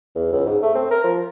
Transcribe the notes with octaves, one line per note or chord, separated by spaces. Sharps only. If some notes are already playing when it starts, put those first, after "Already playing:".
E2
C#2
G#2
A3
C4
A#4
F3